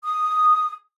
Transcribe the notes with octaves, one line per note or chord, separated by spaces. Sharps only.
D#6